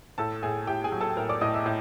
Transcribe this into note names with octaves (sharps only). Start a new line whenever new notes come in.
A2 A4 A5
A2 G#4 G#5
A2 G4 G5
G#4 G#5
F#3
A4 A5
A2 A#4 A#5
D5 D6
A2 D#5 D#6
E5 E6
A2